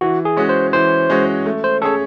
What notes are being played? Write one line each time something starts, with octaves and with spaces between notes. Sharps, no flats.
E3 F#4
G#4
G#3 C#4 F#4 C#5
C5
E3 C5
G#3 C#4 F#4 C#5
A3
C5
C#4 G#4 A4 C#5